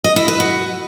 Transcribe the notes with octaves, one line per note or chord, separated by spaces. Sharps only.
D#5
E4
B4
F#4